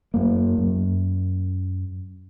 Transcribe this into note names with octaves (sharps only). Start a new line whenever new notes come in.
F#2 A#3
F#2